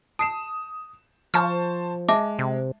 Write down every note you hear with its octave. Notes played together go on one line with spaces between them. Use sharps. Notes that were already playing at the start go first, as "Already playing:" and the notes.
A5 D#6 C7 E7
F3 C5 A5 C#6 F6
G#3 E5 A5 D6
C3